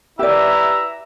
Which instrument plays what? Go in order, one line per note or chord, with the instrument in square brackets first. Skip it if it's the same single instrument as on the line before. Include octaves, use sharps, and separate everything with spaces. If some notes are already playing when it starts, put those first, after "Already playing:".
[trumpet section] E4 B4 A#5 [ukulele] G4 D5 [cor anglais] E5